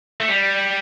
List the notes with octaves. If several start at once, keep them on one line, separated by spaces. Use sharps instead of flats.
A3
G3